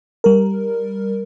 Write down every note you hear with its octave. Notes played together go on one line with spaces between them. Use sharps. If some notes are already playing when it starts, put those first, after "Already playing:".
G3 A#4